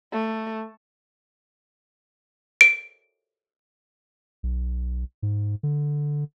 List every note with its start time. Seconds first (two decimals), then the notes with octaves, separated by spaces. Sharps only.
0.12 A3
2.61 D7
4.43 B1
5.22 G#2
5.63 D3